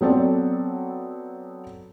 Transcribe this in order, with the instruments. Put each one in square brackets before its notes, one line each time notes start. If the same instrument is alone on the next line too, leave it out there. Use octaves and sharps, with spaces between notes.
[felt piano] F#3 B3 C4 A4 C#5 D5